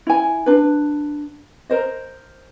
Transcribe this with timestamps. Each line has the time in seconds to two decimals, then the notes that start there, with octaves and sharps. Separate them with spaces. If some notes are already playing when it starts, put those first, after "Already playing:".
0.07 E4 G#5
0.46 D4 B4
1.70 A#4 C5 D#5